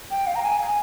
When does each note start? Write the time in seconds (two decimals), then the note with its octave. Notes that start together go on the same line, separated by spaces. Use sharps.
0.11 G5
0.27 F5
0.35 A#5
0.43 G#5
0.60 G#5